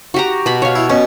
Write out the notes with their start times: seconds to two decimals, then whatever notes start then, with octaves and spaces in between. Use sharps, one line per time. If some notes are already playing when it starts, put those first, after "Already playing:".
0.14 F#4 G4 A#5
0.46 B2 B5
0.62 C#5 F5
0.76 E4
0.90 B2 C#4